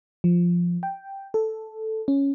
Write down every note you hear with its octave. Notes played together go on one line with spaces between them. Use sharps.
F3
G5
A4
C#4